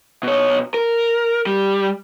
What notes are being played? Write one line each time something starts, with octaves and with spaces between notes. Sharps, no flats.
B2 C#5
A#4
G3